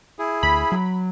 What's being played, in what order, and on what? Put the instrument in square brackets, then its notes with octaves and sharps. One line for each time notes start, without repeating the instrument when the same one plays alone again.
[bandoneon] E4 G#4
[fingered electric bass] D2 [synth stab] B5
[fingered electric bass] F#3